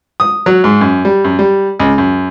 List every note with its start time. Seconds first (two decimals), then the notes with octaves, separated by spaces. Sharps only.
0.20 D#6
0.46 F#3
0.64 G#2
0.81 F#2
1.05 G3
1.24 F#2
1.39 G3
1.79 C#2
1.98 F#2